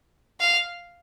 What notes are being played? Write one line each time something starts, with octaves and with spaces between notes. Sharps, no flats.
F5